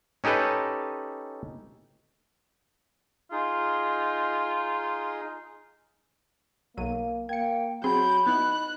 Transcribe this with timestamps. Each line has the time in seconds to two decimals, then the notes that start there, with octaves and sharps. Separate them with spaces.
0.24 C#4 D#4 G4 A4 B4
3.32 D#4 F4 G#4
6.77 B1 F#3 A#3 D#7
7.29 A#3 G5 G#6 C#7
7.84 F#3 C4 G#4 B5 C6 G6
8.27 B3 D#4 E4 F#6